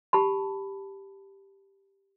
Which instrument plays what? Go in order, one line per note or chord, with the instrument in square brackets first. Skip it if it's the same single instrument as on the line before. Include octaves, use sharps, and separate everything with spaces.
[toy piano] G4 A5 B5